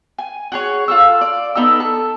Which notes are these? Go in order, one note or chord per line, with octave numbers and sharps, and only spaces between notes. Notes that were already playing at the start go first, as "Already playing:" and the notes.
G#5
F#4 G#4 C#5
F4 A4 E6
D5
B3 D#4 A4 E6
A4